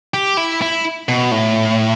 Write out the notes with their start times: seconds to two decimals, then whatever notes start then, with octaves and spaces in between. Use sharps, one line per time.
0.14 G4
0.37 E4
0.62 E4
1.09 B2
1.31 A2